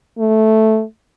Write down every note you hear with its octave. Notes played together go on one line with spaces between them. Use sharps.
A3